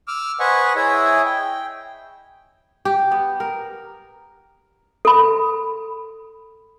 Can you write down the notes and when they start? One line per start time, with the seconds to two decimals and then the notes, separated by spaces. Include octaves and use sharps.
0.08 D6 E6 F6
0.40 B4 C5 D#5 F#5 G#5 C#6
0.76 E4 G#4 C#5 D#5 E5
1.25 G5
2.85 G4
3.12 B3
3.40 A#4
5.05 A4 B5